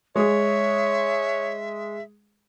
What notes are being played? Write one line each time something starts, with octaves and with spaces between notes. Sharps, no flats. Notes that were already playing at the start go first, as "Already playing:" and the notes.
G#3 G#4 C#5 E5